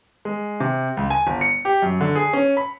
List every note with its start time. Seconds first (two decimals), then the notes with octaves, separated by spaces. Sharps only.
0.25 G#3
0.60 C3
0.97 C#2
1.10 G#5
1.27 G1
1.41 C#7
1.65 G4
1.82 F#2
2.01 D3
2.15 G#4
2.33 C#4
2.57 B5